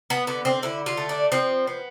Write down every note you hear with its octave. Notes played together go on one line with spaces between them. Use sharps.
B3
D3 B3
C4
D3 E4
F4
A3
D4
F3 C4
B3